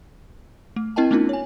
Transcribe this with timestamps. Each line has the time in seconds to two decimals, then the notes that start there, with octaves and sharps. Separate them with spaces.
0.76 A3
0.96 C4 E4 A#4 D#5 G5 A5
1.11 A3 B3 C#4 D#4 F4 A#4
1.29 C#5 G#5